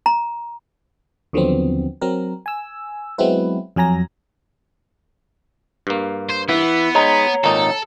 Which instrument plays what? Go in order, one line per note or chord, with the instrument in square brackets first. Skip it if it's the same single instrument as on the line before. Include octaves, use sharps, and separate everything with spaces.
[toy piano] A#5
[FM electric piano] D#2 D3 F3 F#3 B3 C4
F#3 C4 A#4
G#5 E6
F#3 G#3 B3 C4 E4 B4
F2 F#3 G#5 A#5 A#6
[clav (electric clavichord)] G2 A#3
[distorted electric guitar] C5
[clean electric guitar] E3 [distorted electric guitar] B3
[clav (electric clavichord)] G#3 D#4 [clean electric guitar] C#5 A#5
[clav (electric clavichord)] G#1 A#2 D#4 [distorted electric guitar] A4